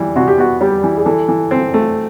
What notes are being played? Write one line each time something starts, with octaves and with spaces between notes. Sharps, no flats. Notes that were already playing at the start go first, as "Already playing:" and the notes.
Already playing: E3 G3
C3 F#4
G4
B3 F#4
G3 G4
E3
G#4
E3 A4
E3
C4
A3